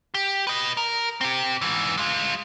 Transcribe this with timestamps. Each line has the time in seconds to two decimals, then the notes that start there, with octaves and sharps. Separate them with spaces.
0.14 G4
0.47 B4 D#5
0.77 A#4
1.21 C4 G4
1.61 G#2 E3
1.98 G#3 F4